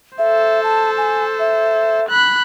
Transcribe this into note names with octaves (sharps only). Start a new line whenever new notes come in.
A4 C5 E5
A5
G#5
E5
B5 F#6